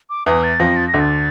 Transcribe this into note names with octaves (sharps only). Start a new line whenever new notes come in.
D6
E2 E3 D#6
A6
F2 F3 A#6
A6
A#6
D2 D3
A6